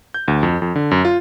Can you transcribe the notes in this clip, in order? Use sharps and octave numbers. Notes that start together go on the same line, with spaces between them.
G6
D2
F2
F2
D3
F#2
F4